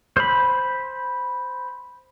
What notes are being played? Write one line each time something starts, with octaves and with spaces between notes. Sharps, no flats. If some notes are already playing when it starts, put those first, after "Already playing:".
C5 B5